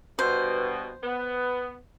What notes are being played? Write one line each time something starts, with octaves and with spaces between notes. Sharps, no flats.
G2 B2 C5
B3